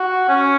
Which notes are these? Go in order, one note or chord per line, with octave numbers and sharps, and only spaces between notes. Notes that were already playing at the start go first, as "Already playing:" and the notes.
Already playing: F#4
C#4